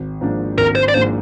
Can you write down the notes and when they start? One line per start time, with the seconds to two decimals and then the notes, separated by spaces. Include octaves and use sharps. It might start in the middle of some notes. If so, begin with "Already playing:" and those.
Already playing: G#1
0.21 G#2 F3 A#3 D4
0.58 G#1 A#4
0.75 C5
0.89 D5
0.94 G#2 F3 A#3 D4 C5